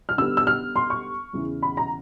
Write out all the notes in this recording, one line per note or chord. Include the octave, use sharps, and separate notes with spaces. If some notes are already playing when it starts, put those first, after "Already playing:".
F6
D3 G3 B3 E6
E6
F6
C6
C#6
E2 C#3 E3
B5
A#5